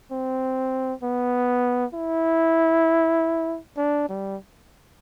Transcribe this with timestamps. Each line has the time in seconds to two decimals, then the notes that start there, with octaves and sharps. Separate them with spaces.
0.11 C4
1.03 B3
1.94 E4
3.77 D4
4.09 G3